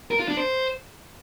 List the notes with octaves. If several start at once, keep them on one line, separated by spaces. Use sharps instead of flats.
A#4
F4
D4
C5